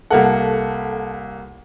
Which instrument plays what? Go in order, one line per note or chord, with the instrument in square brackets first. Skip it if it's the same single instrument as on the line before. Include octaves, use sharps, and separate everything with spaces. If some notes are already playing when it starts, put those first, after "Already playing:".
[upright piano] C2 A#3 F#5 [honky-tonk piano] A4